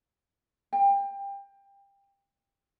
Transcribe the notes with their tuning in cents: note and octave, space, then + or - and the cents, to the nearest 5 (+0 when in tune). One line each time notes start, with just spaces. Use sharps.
G5 +25